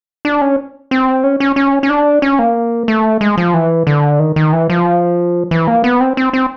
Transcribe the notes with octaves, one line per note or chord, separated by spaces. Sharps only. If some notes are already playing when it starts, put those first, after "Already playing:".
D4
C#4
C4
C#4
C#4
C#4
C#4
D4
C#4
A#3
A3
G#3
F3
E3
D3
D#3
D#3
E3
F3
E3
A#3
B3
C4
C4
C4